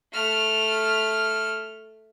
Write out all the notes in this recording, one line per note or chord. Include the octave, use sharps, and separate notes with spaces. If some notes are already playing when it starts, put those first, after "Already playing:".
A3 F6